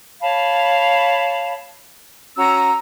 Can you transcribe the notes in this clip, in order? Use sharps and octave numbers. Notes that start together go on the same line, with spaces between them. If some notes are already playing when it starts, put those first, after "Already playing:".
C#5 F5 A5 B5
C#4 F#4 A#5 E6